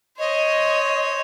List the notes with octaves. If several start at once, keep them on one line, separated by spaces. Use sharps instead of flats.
C5 C#5 D#5